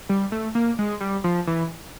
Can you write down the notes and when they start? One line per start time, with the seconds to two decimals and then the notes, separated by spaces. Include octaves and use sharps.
0.09 G3
0.32 A3
0.55 A#3
0.79 G#3
1.01 G3
1.24 F3
1.47 E3